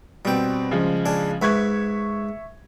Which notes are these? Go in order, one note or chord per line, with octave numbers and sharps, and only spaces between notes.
B2 G3 C4 G5
C#3 F3 G#3
D4 G#4
G#2 B4 E5 C#6 G#6